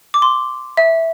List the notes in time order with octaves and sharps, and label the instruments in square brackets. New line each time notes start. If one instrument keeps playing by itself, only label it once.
[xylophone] D6
C6
E5